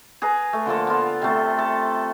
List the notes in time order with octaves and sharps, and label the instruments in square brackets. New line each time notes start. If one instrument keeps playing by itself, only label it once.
[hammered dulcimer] G#4 B4 A#5
A3
D3 F3 A#3 A4
B3 F4
C3 A3
A4